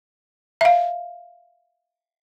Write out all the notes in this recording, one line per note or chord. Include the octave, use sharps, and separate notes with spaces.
E5 F5